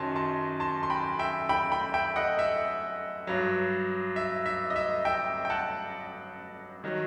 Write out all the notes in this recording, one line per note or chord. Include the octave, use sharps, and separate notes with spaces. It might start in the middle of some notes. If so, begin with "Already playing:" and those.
Already playing: F#2 D#3 F#3 A5 C6
A5 C6
A5 C6
C6
G5 B5
E5 G5
G5 B5
G5 B5
E5 G5
D#5 F#5
E5
G2 F#3
E5
E5
D#5
E5
E5 G5
G5
F#5 A5
D#3 F#3